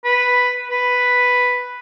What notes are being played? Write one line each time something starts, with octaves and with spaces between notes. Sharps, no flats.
B4
B4